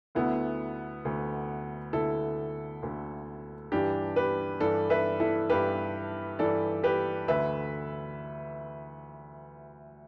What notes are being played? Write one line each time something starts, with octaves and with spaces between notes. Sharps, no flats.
D2 D3 B3 E4
D2 D3
D2 D3 E4 A4
D2 D3
G2 E3 D4 G4
G4 B4
G2 E3 A4 D5
B4 E5
E4 A4
G2 E3 G4 B4
G2 E3 A4 D5
G4 B4
D2 D3 B4 E5